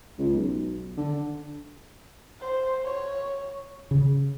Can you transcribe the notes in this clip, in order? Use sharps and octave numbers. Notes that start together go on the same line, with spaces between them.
C#2
B1
D3
C5
C#5
C#3